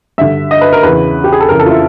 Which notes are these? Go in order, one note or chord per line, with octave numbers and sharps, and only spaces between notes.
G2 D3 E5
D#5
B4
A#4
E2 C#3 E3 B4
G4
G#4
A4
F2 C#3 E3 A#4
A4
F4
E4